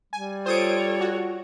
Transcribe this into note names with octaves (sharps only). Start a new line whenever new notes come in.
G3 G#5
F4 A4 C5 C#5 D#6 D7
F#4